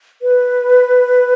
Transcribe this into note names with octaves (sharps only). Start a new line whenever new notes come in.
B4